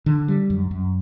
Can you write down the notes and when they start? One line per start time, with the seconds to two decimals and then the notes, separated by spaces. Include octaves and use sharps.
0.06 D3
0.28 G3
0.50 F#2
0.71 F#2